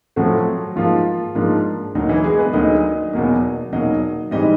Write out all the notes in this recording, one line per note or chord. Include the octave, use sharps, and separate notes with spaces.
A2 F3 F#3 A3 C4 F#4
G#2 F3 A#3 F4
G#2 F3 A#3 D4
D2 D3 F#3 A#3 D#4
E3 E4
G#3 G#4
B3 B4
D2 D3 F#3 A#3 D#4 D#5
E2 B2 F#3 A#3
E2 B2 F#3 A#3 D#4 D#5
G#2 E3 G3 C4 D#4 D#5